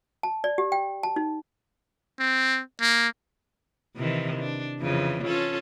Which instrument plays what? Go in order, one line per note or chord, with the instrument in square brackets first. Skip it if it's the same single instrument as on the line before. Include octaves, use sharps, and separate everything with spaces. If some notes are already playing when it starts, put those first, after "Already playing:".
[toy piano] A5
D5
G4
G5
A5
D#4
[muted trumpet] C4
A#3
[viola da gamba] C3 D#3 E3
D4
F2 C#3 E3
C#4 F4 A4